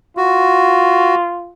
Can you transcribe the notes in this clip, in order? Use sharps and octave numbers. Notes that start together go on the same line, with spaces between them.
F4 F#4